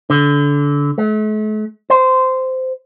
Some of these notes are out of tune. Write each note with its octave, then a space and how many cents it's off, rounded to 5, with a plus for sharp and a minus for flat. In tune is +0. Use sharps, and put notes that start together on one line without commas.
D3 -25
A3 -45
C5 -15